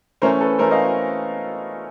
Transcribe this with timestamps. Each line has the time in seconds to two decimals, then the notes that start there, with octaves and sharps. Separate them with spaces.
0.22 E3 A3 C#4 A#4 C5
0.41 A4 B4
0.59 E3 A3 C#4 A#4 C5
0.71 D#5 F5